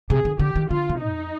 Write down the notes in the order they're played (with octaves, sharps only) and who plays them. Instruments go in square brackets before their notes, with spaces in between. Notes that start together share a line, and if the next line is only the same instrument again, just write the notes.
[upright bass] C3 [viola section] G#4
[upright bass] D3
[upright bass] D3 [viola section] G4
[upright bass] D#3
[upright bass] D3 [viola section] F4
[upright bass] C3
[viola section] D#4
[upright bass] F2